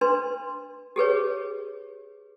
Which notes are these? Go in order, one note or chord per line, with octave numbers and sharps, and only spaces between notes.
D4 B4 C6
G4 G#4 B4 C#5